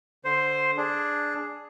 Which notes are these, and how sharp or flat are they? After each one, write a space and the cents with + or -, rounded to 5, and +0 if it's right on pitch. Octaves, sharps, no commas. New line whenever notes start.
D3 +0 C5 +0
D4 +0 G#4 +5